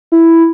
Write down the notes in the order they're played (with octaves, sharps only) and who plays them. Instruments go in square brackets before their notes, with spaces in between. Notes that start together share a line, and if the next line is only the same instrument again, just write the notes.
[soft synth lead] E4